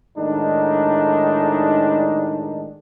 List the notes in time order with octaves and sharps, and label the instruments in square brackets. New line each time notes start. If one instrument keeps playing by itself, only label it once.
[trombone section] A2 D#3 G#3 D4 D#4